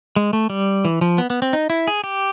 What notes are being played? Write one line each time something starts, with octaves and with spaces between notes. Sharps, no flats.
G#3
A3
G3
E3
F3
B3
B3
C4
D#4
E4
G#4
G4